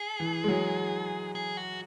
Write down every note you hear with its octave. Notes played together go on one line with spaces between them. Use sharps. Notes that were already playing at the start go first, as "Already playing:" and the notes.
Already playing: G#4
E3
G#3
F#3
G#4
F#4